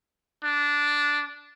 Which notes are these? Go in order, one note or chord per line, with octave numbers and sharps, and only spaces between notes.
D4